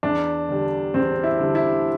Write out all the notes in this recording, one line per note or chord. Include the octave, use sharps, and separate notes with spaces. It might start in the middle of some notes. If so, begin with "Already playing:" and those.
E2 D4
D3 G3
E2 C4
E4
D3 G3
E4